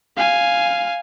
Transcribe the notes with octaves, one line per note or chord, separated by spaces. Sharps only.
F5 G#5